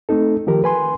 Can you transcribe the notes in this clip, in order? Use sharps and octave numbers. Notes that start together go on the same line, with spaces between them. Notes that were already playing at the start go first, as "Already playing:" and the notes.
A3 C4 D#4 A4
D#3 F3 G4 A#4
B4 G#5 C6